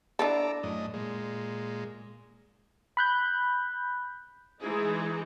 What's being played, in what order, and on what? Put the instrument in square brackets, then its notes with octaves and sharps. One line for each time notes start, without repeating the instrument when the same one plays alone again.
[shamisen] D4 E4 A4 [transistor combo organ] A#5 D6 E6
[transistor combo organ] F#2 A2 D#5
A#2 G#3
[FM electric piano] B5 F#6 G6
[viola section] E3 G#3 D#4 E4 G#4